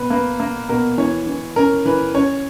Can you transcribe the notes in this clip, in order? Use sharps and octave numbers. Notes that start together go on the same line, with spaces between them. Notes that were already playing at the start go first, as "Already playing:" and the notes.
Already playing: B2 B4
A#3 B4
A#3
B2 A#4
E3 C#5
E3
C#4 A#4
E3 B4
C#4 C#5